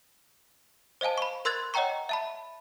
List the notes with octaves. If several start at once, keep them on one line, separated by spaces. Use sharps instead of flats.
C5 D#5 F5 G#5 A5
B5 C#6
A#4 C6 E6 F#6 G#6 A6
C#5 D#5 F#5 G5 A#5 C#6
E5 A5 B5